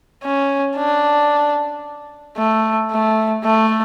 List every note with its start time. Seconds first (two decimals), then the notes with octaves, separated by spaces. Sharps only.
0.24 C#4
0.77 D4
2.37 A3
2.91 A3
3.44 A3